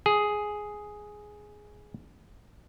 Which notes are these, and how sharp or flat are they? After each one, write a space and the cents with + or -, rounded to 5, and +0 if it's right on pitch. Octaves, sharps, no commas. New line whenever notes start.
G#4 +5